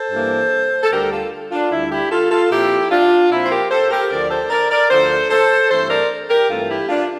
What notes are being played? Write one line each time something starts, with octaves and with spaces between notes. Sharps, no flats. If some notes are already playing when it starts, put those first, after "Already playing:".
Already playing: A4 C5
G2 E3 A#3 D4
A4
D2 D3 G3 G4 A#4
F4 A4
D4 F4
D2 D3 G3 E4
E4 G4
F4 A4
F4 A4
A#2 F3 C4 E4 G4
D4 F4
A#2 F3 C4 E4
C5
G4 A#4
A4 C5
G4 A#4
D2 D3 F3 A#4 D5
A4 C5
A#4 D5
A#4 D5
D2 D3 F3 A4 C5
A4 C5
G2 E3 A3 C4 A4 C5
A#4 D5
G4 A#4
G2 E3 A3 C4 F4 A4
E4 G4
D4 F4